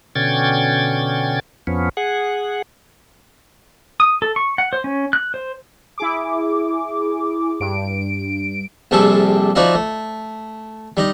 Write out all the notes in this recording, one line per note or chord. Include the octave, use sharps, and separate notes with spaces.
B2 D3 C#4 G5 G#6 A6
F2 F3 B3 C#4
G#4 F#5
D#6
A4
C#6
F#5
C5
C#4
F#6
C5
E4 G#4 D6
G2 D7
A#1 C3 G3 G#4 A4 D6
F3 D#4 E4 F#4 D5 D#5
A3
G3 D#4 D#5